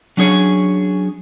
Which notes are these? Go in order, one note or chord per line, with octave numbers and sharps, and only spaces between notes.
F#3 C#4 D4 G#4 C#5